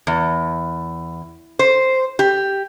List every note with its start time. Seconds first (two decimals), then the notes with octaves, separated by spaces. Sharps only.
0.07 E2
1.59 C5
2.19 G4